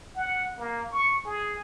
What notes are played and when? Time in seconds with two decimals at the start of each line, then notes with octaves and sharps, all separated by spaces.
0.16 F#5
0.58 A#3
0.92 C#6
1.26 G#4